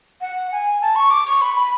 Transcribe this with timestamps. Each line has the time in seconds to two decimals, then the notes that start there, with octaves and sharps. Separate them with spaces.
0.21 F#5
0.52 G#5
0.82 A5
0.95 C#6
1.10 D6
1.26 C#6
1.41 B5
1.56 B5